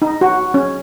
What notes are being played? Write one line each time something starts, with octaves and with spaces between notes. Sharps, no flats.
D#4
F#4
C#4